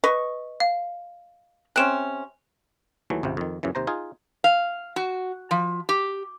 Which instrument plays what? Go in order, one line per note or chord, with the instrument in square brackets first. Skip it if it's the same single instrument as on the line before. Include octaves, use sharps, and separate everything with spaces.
[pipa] B4 D#5 C#6
[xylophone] F5
[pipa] C3 C4 C#4 [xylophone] F#6 D7 E7
[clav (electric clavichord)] D#2 E3 F#3 A3
G#1 C#2 C3
F2 D#3
F#2 A#2 C#3 E3
D#2 C3 C5 A#5
D#4 F4 G#4
[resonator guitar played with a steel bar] F5
F#4
F3
G4